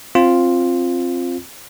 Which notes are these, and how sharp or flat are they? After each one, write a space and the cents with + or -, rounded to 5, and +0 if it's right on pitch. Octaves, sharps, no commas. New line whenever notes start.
C4 +15 F4 +0